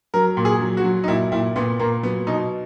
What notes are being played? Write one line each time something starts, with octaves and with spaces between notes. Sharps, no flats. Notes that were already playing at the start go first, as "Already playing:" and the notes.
F#3 A#4
A#2
G#4
F#3
F#4
F#3
D#4
A#2 E4
A#2 E4
A#2 B3
A#2 A#3
F#3 B3
B2 D#4